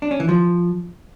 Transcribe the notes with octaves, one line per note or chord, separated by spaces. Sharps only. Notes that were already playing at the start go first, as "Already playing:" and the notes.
D4
C#4
E3
F3